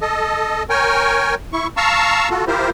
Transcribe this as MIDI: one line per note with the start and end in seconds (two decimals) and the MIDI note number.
0.01 0.63 69
0.01 0.63 75
0.70 1.35 70
0.70 1.35 73
0.70 1.35 79
0.70 1.35 80
1.53 1.67 64
1.53 1.67 85
1.77 2.29 77
1.77 2.29 81
1.77 2.29 82
1.77 2.29 85
1.77 2.29 88
2.30 2.45 65
2.30 2.45 66
2.30 2.45 69
2.47 2.70 64
2.47 2.70 65
2.47 2.70 67
2.47 2.70 70
2.47 2.70 72